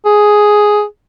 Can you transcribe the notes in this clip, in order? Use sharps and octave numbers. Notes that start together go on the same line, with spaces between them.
G#4